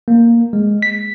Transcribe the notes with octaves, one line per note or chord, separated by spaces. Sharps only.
A#3
G#3
B6